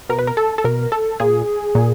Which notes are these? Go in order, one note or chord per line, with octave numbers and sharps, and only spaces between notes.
B2 A#4
B4
A#4
A4
A4
B2 A#4
A4
A#2 G#4
A#2